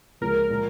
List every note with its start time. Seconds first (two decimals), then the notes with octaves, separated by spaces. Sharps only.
0.21 C#2 C#3 F3 A#3 A#4
0.49 A#2 F3 G#3